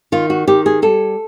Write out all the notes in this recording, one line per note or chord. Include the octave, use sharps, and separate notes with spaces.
D#3 F4
F#4
D#3 G4
G#4
G3 A4